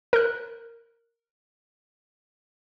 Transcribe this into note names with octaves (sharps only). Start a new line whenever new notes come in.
A#4 F#6